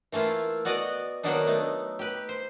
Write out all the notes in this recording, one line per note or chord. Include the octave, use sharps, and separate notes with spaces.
E3 A3 A#3 E4 F4
B3 F#4 D5 D#5 G#5
D#3 F#3 A#3 B3 D4 D#4
A3 D#4
G4 B4
C5